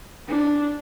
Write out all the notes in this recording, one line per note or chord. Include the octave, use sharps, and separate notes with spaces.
D4